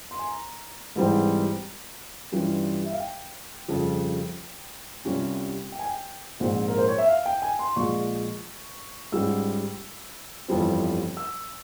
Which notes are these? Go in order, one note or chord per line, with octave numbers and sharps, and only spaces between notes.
C6
G#5
A#5
G#2 E3 G3 C4
G2 E3 G3 C#4 F4
E5
F5
G5
F2 C#3 G3
C2 C3 G3 C#4 F4
G5
G#5
G5
A#1 G#2 F3 C4
A#4
C5
C#5
E5
F5
G5
G#5
C6
A#1 A#2 G#3 C#6
G#2 G3 C#4 F4 E6
G1 F2 E3 G3 C4
E6